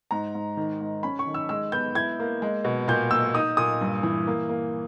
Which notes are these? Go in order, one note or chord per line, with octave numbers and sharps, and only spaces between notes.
G#2 A#5
G#2
D#3
G#2
C#4 B5
C#6
D#3
E6
G#3 E6
B3 G6
E4 G#6
A#3
G#3
B2
A#2 G6
A#3 E6
D#4 D#6
A#2 D#6
G2
E3
A#3
A#3